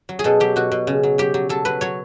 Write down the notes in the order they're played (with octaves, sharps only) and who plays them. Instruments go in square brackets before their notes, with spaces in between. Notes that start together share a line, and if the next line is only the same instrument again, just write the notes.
[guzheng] F#3
G#4
B2 A4
F#3 G4
B2 F#4
B2
C#3
F#3
F#3 G4
F#3
F#3 A4
F#3 B4
F#3 C#5